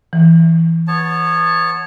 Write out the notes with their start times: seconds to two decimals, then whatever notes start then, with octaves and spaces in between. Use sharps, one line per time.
0.13 E3
0.88 B3 C#5 A5